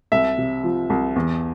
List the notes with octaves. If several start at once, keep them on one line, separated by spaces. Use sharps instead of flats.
C2 E5
C3
F3
C2
E2